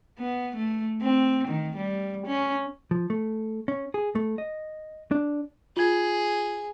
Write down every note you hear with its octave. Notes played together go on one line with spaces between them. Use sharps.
B3
A3
C4
D#3
G3
C#4
F3
A3
C#4
G#4
A3
D#5
D4
F4 G#4 G#6